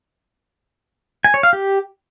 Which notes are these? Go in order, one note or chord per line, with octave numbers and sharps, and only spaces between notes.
G#5
C#5
F5
G4